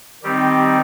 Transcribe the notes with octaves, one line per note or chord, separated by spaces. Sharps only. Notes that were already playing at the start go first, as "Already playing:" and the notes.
D#3 G3 C4 D#4 G4